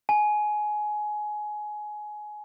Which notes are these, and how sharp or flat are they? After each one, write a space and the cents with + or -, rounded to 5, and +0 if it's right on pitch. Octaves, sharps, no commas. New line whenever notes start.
G#5 +20